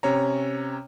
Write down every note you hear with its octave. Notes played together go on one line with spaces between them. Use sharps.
C3 C#4 C#5 A#5